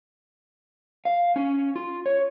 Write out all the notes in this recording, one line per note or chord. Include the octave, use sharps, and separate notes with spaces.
F5
C#4
F4
C#5